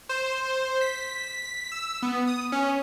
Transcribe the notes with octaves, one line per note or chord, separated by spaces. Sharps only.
C5
B6
E6
B3
D#6
C#4